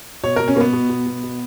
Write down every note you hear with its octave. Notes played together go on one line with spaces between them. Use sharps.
B2 C#5
B2 A#4
C#4
B2 A#3 B3
B2
B2
B2
B2